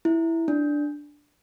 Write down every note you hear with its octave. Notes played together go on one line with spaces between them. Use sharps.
E4
D4